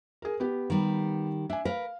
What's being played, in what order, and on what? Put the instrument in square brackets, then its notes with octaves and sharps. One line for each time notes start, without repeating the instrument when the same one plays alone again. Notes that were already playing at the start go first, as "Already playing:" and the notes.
[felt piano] G#4 A#4
B3 G4
[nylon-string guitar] D#3 G3
[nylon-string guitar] D4 [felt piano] E5 G#5
[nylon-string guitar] A#4 B4 [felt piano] F5